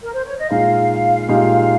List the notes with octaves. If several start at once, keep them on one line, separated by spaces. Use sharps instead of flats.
A#4
C5
C#5
D#5
A#2 G#3 D#4 F5
A#2 G#3 D#4 G4